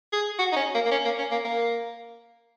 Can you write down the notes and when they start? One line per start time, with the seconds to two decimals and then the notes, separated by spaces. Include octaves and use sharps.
0.13 G#4
0.39 F#4
0.52 D#4
0.57 C#4
0.75 A#3
0.85 A#3
0.92 C#4
1.05 A#3
1.19 C#4
1.31 A#3
1.45 A#3